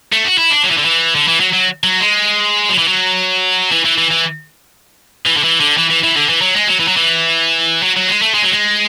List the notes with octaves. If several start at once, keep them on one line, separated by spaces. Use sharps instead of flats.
A3
F#4
E4
D4
F#3
E3
D3
E3
D3
E3
F#3
F#3
F#3
G#3
F#3
E3
F#3
E3
E3
E3
E3
E3
D3
E3
D3
E3
E3
E3
D3
E3
F#3
G#3
F#3
E3
F#3
E3
F#3
F#3
G#3
A3
G#3
F#3
G#3